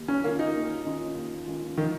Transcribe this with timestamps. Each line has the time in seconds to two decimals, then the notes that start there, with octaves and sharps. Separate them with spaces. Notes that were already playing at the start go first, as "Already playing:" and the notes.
Already playing: D#2
0.08 C#4
0.24 D#3 A#3 C#4 F4
0.39 D#4
0.54 D#2
0.86 D#3 C#4 F4
1.16 D#2
1.46 D#3 C#4 F4
1.78 D#3